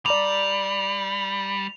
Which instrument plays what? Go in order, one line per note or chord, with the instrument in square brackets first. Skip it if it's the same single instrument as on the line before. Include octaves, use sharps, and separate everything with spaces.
[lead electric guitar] G3 [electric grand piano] D5 A#5 D6 [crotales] F7